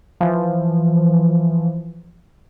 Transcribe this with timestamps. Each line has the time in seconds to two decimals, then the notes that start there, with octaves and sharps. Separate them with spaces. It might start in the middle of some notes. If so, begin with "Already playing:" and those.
0.21 E3 F3